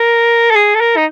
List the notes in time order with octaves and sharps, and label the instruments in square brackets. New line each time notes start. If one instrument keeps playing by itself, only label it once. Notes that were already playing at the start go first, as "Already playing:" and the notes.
Already playing: [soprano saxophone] A#4
A4
G#4
A4
A#4
D#4